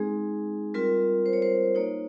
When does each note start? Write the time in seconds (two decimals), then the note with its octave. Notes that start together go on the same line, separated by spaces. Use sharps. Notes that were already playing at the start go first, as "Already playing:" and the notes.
Already playing: G#3 C4 D#4 G#4
0.74 G3 C4 F4 A#4
1.26 C5
1.33 C#5
1.42 C5
1.75 A#3 D#4 C#5